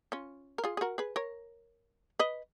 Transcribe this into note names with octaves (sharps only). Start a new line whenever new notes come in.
C#4 F4
A#4
F4 G#4
G#4
F#4 A#4
G#4 B4
A#4 C#5
B4 D#5